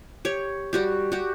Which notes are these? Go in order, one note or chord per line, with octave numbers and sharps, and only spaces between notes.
G4 C#5
G3 F#4 G4
F#4 G4